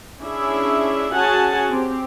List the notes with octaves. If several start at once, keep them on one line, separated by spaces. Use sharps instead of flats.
C#4 D4 E4 G#4 E5
C#4 F#4 G#4 F#5 G#5 A5
C4 G4